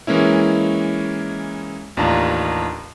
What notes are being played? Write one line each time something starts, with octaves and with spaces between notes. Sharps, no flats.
E3 G#3 A#3 C#4 E4
A1 D#2 D4 F4 A5 A#5